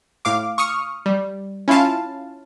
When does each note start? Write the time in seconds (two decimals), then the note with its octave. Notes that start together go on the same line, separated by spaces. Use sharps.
0.25 A2 F5 D6
0.58 C#6 D#6 F6 C#7
1.06 G3
1.68 C#4 E4 F4 F5 A5